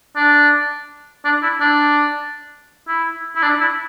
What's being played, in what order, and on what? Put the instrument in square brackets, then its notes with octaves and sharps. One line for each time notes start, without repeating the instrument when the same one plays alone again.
[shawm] D4
D4
E4
D4
E4
E4
D4
E4